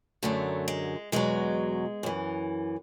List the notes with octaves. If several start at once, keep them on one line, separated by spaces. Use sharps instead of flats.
F#2 D3 F#3 A3
G#3
E2 B2 F#3 G#3
F#2 E3